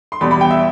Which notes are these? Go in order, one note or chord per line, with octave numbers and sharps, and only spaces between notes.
C6
E2 B2 G3 B5
B5
G5
E5